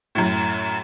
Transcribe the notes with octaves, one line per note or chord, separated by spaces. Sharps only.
F#2 A2